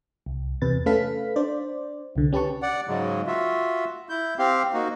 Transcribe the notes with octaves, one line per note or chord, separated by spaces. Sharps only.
C2
E2 C3 B4 A6
A3 C#4 A4 B4 F5 B6
D4 C5 D5
C2 D3
C#4 G4 B4 A5 C#6
D5 F#5
G#2 C#3 F#3 G#3
F4 F#4 E5
E4 G6
C4 G4 F5
A#3 D#4 F#4